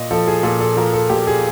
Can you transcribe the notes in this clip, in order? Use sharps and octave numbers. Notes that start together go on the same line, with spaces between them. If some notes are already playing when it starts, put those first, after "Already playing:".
Already playing: A#2 D#5
F3 A4
G#4
A#2 A4
A4
F3 A#4
A4
A#2 G4
G#4